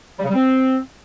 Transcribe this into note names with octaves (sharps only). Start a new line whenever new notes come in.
G3
C#3
G3
C4